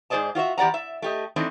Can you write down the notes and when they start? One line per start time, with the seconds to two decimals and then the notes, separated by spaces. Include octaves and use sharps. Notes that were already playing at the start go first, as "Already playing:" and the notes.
0.10 G#2 G#4 C5 D5 D#5 A5
0.35 F4 F#4 C#5 E5
0.58 E2 G4 D5 F#5 A#5
0.74 E5
1.02 A3 G4 D#5
1.36 E3 A3 C4 D4 D#4